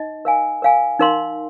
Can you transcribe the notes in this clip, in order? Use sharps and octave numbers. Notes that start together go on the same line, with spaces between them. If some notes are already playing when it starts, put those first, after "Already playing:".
Already playing: D#4 D#5
A#4 F5 G#5
A#4 F5 G#5
D#4 A#4 F5 C6